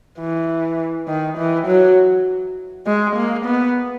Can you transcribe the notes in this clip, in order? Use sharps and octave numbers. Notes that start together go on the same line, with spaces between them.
E3
D#3
E3
F#3
G#3
A#3
B3